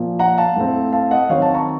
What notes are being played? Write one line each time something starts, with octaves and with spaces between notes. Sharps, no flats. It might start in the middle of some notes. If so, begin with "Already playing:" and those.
Already playing: A#2 F3 A#3
F#5 A#5
F5 A5
A2 A3 C4
F5 A5
D#5 F#5
D#3 F#3 C4 C#5 F5
F5 A5
A#5 C#6